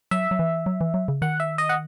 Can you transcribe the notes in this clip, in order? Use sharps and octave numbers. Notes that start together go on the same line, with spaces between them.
F#3 E5
F#3
E3
F#3
E3
F#3
C#3
D#3 F#5
E5
D#5
F#5